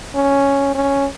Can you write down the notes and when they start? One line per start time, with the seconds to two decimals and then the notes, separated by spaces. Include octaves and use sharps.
0.15 C#4
0.75 C#4